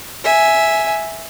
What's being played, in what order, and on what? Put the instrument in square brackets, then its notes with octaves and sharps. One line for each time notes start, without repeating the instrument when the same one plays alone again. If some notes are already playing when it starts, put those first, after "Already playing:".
[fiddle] E5 G#5